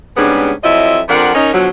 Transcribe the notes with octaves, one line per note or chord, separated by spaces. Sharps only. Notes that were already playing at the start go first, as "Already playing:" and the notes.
G#2 C#3 G3 B3 C#4 D4
F2 F3 F#3 E4 D#5 E5
F2 F3 D4 A#4 F#5
C#4 D#4 A#4
B2 D3 F3 F#3